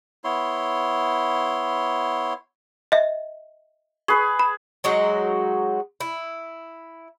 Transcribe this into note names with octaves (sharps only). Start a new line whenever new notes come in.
B3 E4 C#5 C6
D#5 E5
G#4 B4 C#6
B5
F#3 G#3 D#4 F#4
E4